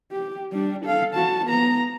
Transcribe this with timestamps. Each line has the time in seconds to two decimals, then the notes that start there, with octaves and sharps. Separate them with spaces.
0.12 G4
0.52 G3 D4
0.85 A4 F5
1.15 F#4 A5
1.46 B3 A#5